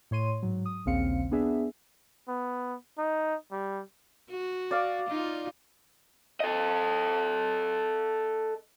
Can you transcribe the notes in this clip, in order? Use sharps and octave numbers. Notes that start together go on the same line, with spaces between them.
A2 C#5 C6 D#7
G#2 F#3
D#6
A#1 D#2 C#3 C4 F5 C#7
B3 D4 G#4 E5
B3
D#4
G3
F#4
D5 F5 D6
D#4 F4
A4 D#5